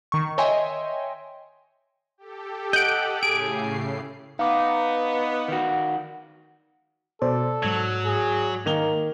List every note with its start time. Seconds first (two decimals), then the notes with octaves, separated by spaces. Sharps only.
0.12 D#3 C#6
0.38 C#5 D#5 E5 G5 G#5 C6
2.18 G4 A4
2.73 D#5 F#5 G6 D7
3.23 A2 C#3 G#4 C7 D7
4.39 B3 D#4 F5 F#5 D6
5.48 D#3 F#4
7.22 B2 A4 C5 D5
7.63 G#2 F#3 G#6
8.05 G#4
8.66 D#3 A#3 F7 G7